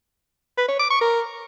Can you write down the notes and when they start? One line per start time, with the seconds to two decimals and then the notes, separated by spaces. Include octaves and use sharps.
0.57 B4
0.68 C#5
0.79 D6
0.90 C#6
1.01 A#4